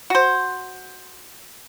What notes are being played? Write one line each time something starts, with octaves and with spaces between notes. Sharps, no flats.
F#4 C5